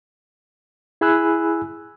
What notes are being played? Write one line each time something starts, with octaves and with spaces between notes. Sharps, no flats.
E4 G#4 G#5 B5 E6 F#6